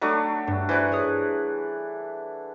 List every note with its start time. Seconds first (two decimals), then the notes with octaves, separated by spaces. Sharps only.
0.02 F#3 A3 D4
0.47 G2
0.69 E3 C5 D5 F#5 B5
0.92 G#4 C#5 D#6